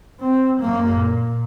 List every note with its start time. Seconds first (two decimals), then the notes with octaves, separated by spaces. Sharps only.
0.20 C4
0.60 F#2 A#3
0.94 A#2